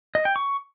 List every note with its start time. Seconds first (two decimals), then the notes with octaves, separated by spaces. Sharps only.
0.15 D#5
0.25 G5
0.36 C#6